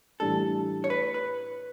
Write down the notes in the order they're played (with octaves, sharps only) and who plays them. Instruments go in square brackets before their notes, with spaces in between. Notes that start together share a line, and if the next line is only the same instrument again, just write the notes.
[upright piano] A2 E3 G3 D4 [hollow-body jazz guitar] A4
[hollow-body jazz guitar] C#5
B4
B4